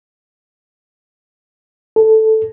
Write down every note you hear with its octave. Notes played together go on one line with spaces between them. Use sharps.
A4